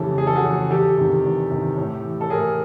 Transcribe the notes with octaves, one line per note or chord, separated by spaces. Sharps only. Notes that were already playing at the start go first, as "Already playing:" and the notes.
Already playing: F2 C#3 E3 G4 A4
F2 G#4
A4
F#4 G#4
C#3 E3
E2 G4 A4
C3 D#3
E2
C3 D#3
A2
E3
A4
A2 G#4 A#4